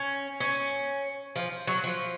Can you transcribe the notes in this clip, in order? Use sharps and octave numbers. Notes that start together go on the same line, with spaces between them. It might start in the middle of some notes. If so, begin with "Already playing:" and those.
Already playing: C#4
C#4
F3
F#3
F3